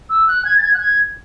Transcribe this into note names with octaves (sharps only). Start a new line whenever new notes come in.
E6
F#6
G#6
A6
G#6
F#6
G#6